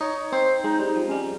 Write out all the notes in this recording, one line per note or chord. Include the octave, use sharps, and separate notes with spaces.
D#4 C#5
C4 C5
G#3 D#4
G3
D#4
F3
C#4
G3